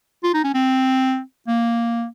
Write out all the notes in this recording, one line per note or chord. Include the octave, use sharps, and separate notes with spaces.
F4
D#4
C#4
C4
A#3